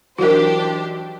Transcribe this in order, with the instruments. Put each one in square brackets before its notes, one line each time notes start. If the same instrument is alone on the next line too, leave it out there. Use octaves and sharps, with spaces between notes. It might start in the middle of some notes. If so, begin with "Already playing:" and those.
[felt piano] E3 F#3 D#4 [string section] D4 G4 C5 [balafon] F#4 A#4